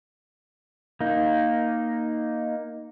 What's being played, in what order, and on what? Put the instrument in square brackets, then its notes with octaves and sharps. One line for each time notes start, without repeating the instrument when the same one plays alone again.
[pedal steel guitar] A#3 D#4